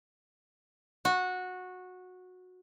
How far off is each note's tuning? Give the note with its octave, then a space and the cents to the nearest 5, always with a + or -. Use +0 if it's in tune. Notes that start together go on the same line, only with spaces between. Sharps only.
F#4 -15